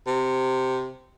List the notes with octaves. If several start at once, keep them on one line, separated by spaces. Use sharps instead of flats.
C3